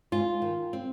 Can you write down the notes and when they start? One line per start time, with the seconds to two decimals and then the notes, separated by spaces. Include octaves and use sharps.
0.12 G#2 F4
0.42 D#3
0.73 C4